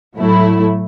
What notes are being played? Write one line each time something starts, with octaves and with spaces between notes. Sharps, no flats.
A2 F#3 A3 E4